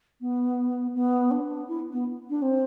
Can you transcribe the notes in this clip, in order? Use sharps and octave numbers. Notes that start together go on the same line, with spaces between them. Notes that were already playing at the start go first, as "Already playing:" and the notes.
B3
B3
D4
E4
B3
D4
C4